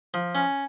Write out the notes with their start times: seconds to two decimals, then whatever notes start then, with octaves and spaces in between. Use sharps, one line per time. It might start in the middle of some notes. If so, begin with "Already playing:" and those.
0.14 F3
0.35 C#4